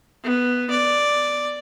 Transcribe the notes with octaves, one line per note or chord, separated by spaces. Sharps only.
B3
D5